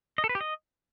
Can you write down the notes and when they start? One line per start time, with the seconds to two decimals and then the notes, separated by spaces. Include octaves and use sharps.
0.18 D#5
0.24 A4
0.29 B4
0.35 G4
0.41 D#5